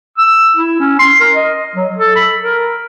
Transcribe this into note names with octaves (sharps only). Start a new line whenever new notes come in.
E6
E4
C#4
C6
A#4
D#5
F#3
A4
B5
A#4